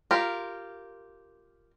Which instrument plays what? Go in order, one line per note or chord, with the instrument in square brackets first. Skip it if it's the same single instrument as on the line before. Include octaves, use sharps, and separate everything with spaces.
[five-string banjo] F4 G4 A#4